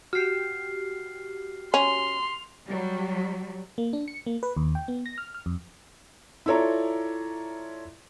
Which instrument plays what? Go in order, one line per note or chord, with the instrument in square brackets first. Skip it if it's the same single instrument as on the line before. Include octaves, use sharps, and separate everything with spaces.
[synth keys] F#4 G4 [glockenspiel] F6 C7
[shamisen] C#4 [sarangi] C6 [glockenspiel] F7
[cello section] F#3 G3
[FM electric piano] A#3
D4
C#7
A#3
B4
D#2
G5
B3
A#6
F6
F6
F2
[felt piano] E4 F4 A4 C#5 D5 A#5